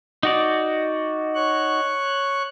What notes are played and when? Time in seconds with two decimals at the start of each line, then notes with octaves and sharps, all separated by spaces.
0.23 D#4 F#4 D5
1.35 C#5 C#6 F#6